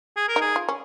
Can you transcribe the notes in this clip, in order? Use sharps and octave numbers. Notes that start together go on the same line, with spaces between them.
G#4
A#4
D#4 G#4
F4
C#4